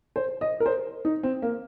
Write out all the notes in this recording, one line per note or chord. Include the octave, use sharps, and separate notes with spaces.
C5
D#5
A#4
C5
D#4
C4
A#3